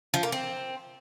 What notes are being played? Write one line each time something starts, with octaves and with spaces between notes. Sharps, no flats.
F3
A#3
C4